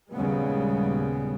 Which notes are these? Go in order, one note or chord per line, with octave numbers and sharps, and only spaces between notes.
A#1 D#2 C#3 G3 G#3 B3